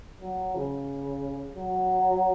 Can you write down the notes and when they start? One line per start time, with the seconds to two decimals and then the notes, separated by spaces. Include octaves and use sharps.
0.22 F#3
0.55 C#3
1.54 F#3